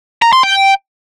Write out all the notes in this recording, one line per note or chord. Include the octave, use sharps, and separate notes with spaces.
A#5
C6
G5